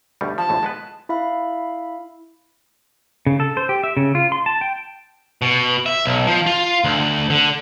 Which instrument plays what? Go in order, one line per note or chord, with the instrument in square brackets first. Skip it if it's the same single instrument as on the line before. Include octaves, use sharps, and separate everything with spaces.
[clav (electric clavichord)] D2 B2 G3
[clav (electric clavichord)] F3 [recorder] A5
[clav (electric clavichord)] A#1 D#2 A2
G#3 B3 B4
[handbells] E4 E5 F5 B5
[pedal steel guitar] C#3
A4
C5
G4
E5
C#3
F4
C6
A5
G5
[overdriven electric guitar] B2
E5
B1
F3
F4
D2
D3